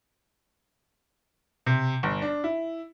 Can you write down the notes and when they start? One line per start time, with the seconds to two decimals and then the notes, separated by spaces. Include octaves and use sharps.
1.66 C3
2.03 G1
2.22 D4
2.44 E4